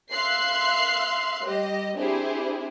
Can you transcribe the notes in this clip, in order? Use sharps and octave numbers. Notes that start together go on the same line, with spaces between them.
E5 F5 C6 F#6 C7
G3 G4 D#5
C4 D4 E4 G4 G#4 C5